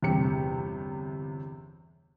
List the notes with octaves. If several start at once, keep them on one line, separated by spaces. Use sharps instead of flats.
G1 E2 C3 G4 C#7